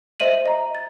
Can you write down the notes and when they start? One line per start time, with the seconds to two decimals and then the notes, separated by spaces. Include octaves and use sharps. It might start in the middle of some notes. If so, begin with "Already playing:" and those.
0.20 C5 D#5 E5 D#7 F#7
0.46 D#5 A#5
0.75 A6